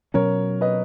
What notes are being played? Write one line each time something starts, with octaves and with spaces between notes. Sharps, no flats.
B2 F#3 C#4 A#4 C#5
B4 D#5